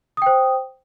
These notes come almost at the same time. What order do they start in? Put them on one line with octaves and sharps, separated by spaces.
D#6 G5 C5